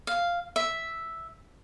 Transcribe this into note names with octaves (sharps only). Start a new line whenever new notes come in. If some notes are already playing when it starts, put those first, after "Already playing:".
F5
E5